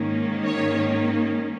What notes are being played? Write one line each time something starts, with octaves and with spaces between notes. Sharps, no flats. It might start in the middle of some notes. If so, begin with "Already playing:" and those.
Already playing: G#2 D#3 A#3 C#4
C#5